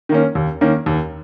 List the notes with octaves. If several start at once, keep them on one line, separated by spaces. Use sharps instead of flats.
D#3 A#3 C#4
D#2
D#3 A#3 C#4
D#2